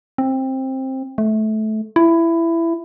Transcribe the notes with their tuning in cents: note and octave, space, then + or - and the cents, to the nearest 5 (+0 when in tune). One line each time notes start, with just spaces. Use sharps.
C4 +15
A3 -20
E4 +15